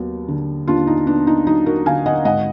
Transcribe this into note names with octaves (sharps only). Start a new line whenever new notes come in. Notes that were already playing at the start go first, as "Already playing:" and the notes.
Already playing: D#2 F#3 B3
D3
D#2 D4 F4
D#4
B3 D4
D#4
F#3 D#4
F#4 A#4
D3 F5 G#5
D#5 F#5
G#1 D#5 F#5